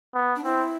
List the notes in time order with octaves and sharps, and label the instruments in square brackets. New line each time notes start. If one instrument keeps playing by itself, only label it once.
[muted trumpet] B3
[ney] D4
[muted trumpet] C4 [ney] E4